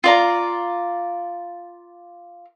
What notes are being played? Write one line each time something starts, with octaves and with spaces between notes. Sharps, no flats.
F4 D5 A#5